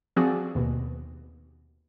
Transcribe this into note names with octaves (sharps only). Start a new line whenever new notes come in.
F3 C4 F#4 G#4 D5
D#2 B2